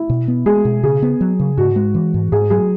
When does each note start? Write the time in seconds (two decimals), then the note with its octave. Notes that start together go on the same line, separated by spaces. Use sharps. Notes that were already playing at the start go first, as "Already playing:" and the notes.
Already playing: E4
0.10 B2
0.28 B3
0.46 G#3 G#4
0.65 B2
0.83 C#3 G#4
1.02 B3
1.21 F#3
1.40 C#3
1.57 G#2 F#4
1.76 G#3
1.95 E3
2.14 G#2
2.32 G#2 G#4
2.50 F#3 G#4